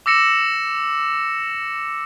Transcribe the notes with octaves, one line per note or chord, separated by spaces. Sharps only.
D6 E6 A#6 C#7 E7